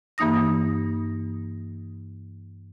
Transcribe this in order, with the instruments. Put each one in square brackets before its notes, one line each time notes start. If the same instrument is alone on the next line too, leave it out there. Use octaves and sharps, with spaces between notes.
[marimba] G2 E3 A#3 D#4 D#6 A#6